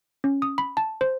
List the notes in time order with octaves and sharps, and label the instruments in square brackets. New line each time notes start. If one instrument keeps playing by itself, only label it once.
[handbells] C#4
D#6
B5
A5
C5